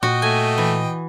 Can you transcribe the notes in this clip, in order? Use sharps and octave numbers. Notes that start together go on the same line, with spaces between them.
A#2 F#4 D#5 G5
A3 G#5
E3